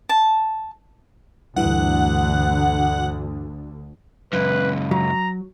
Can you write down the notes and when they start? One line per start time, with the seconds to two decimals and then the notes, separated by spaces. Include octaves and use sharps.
0.09 A5
1.56 D2 G2 D3 E3 F#5
4.33 C#2 F#2 B4
4.91 F#3 A#5